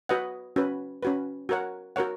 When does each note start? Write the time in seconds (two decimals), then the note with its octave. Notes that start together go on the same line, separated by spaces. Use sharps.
0.09 F#4 B4 D#5 F#5
0.56 C#4 F#4 B4
1.03 C#4 F#4 B4
1.49 F#4 A#4 C#5 F#5
1.96 F#4 A#4 C#5 F#5